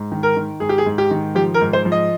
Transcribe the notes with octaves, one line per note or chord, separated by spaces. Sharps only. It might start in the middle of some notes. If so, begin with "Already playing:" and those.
Already playing: G#2
D#3
A#4
D#3
G#2 G#4
G4
G#4
G#2
G4
D#3
F3 G4
A#4
G#2
C5
F3
D#5